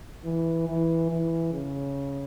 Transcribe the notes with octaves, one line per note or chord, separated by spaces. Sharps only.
E3
E3
E3
C#3